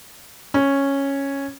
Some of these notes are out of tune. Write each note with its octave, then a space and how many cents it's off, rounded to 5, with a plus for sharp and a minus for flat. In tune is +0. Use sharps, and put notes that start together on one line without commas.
C#4 -5